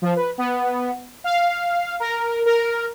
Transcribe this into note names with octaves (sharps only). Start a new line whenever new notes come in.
F3
B4
B3
F5
A#4
A#4